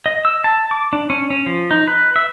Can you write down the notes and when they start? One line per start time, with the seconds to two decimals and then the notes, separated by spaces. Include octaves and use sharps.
0.06 D#5
0.25 E6
0.44 A5
0.71 D6
0.93 D4
1.10 C#4
1.30 C#4
1.46 F3
1.71 D#4
1.87 B4
2.16 E5